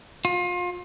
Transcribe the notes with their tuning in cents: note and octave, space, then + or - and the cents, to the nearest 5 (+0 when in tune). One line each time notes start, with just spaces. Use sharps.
F4 +30